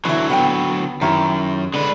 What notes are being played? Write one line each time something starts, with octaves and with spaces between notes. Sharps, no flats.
D3 E3 F#3 E4
B3 F#5 G5
F#2 D#3 E4 G4
D3 G#3 B4